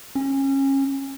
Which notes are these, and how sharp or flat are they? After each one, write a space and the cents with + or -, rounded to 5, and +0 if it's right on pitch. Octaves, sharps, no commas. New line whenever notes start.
C#4 -25